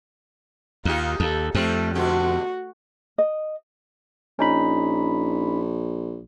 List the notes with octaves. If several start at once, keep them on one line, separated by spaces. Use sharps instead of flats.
D#2 A#3 D#4 F4 G4
D#2 A4
F2 G3 A3 C4 G4
B2 D3 F#4 G4
D#5
A#1 C#4 D#4 B5